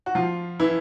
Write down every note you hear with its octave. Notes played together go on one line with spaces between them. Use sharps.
F#4
F3 F4
E3 E4